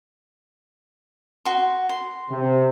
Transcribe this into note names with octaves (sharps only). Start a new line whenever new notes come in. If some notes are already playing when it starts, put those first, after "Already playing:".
F#4 C6
C6
C3